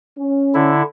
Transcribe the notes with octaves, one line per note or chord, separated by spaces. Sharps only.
C#4
D3 E4